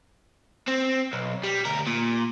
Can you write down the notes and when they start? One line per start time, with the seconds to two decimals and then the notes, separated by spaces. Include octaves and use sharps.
0.68 C4
1.13 B1
1.44 G3
1.65 D2 A#4
1.87 A#2